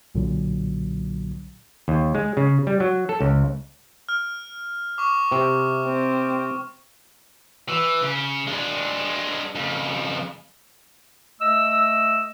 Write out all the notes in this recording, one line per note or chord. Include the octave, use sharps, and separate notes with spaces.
B1 A#2 D3 F#3
D#2
G#3
C#3
G3
F#3
A4
C#2
F6
C#6 D6
C3
C4
E3
C#3
G#3 D4
F2 C#3
A3 D#5 E6